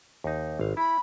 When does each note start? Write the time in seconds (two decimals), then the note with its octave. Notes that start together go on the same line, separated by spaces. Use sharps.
0.24 D#2 D#4
0.60 G#1 F5
0.77 E4 B5